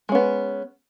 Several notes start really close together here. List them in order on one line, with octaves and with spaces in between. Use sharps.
G#3 C#4 B3